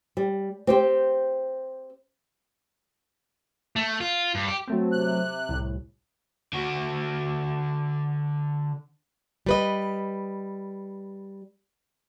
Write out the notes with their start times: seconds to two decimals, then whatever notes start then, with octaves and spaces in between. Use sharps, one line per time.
0.17 G3
0.67 C4 G4 C5
3.76 A3
4.00 F4
4.35 G2
4.48 G4
4.67 F#3 A3 C4
4.92 C3 F#6
5.49 C2 A2
6.53 D3 F#4
9.46 G3 B4 D#5